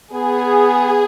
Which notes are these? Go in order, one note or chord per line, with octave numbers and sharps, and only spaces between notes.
B3 G#4